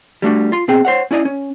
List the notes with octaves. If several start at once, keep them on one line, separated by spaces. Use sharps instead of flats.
G3 A3 D4 F#4
F4 C6
B2 C4 G#4 G5
C5 C#5 F#5
C#4 E4 D5 D#5
C#4